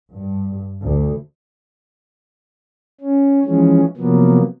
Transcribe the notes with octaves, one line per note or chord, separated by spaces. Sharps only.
G2
D2
C#4
E3 F3 G#3 C#4
C3 F3 F#3 A#3 B3